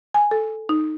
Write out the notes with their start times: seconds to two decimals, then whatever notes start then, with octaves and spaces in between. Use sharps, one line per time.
0.14 G#5
0.31 A4
0.69 D#4